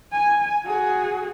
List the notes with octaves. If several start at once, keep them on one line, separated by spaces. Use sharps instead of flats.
G#5
F#4 G#4